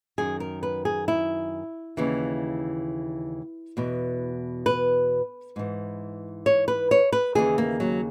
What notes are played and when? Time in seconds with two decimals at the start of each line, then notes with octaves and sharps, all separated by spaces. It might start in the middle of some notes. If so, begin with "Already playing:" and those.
0.18 F#2 D#3 G#4
0.40 A#4
0.63 B4
0.85 G#4
1.08 E4
1.97 D#2 C#3 E3
3.77 E2 B2
4.66 B4
5.56 G#2 E3
6.46 C#5
6.68 B4
6.91 C#5
7.13 B4
7.35 D#2 C#3 E3 G#4
7.58 A#3
7.80 F#3